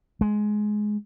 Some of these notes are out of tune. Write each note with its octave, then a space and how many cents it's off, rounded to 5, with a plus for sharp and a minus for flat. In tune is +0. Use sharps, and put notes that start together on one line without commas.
G#3 +15